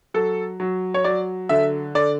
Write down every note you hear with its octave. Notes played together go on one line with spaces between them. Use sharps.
F#3 A4
F#3
C#5
F#3 D5
D3 E5
D3 D5